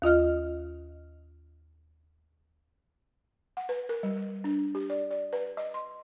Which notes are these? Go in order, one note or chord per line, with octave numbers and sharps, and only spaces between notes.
D#2 F4 D#5 F6
F#5
B4
A#4
G3
D4
G4
D5
D5
B4
D#5
C6